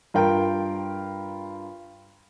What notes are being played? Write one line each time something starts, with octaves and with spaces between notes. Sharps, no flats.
G2 F4 A#4 G5